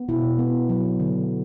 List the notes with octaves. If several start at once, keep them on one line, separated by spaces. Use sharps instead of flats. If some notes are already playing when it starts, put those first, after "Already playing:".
Already playing: B3
B2 E4
B3
F#3
D3